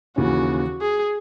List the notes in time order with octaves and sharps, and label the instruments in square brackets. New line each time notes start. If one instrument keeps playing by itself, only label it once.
[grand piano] D#2 C#3 E3 A#3 C#4 [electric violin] F#4
[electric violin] G#4